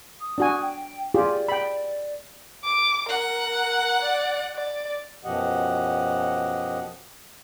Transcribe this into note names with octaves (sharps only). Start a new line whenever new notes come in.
D#6
D4 F#4 G#5
G5
F4 G4 G#4 D5
G5 B5
D6
A#4 F#5
D5
D5
F#2 B2 F3 G4 D#5 F#5